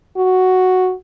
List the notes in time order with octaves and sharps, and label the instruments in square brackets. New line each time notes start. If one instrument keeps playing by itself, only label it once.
[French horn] F#4